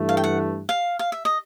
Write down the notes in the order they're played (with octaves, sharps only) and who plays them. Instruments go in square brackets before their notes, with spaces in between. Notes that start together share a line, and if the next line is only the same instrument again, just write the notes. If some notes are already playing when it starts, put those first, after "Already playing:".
Already playing: [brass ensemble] G2 E3 A3
[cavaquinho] F5
G5
F#5
F5
F5
E5
D#5